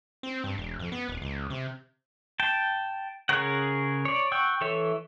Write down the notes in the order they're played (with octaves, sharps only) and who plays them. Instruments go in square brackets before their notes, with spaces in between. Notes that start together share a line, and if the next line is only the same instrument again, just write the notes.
[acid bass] C4
G2
E1
F2
B3
D#1
C#2
C3
[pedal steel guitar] G5 A5
C#3 G#4 A#4 C#5 F#5
C#5 D5
F#5 G5 C#6 E6
E3 A4 C#5 E5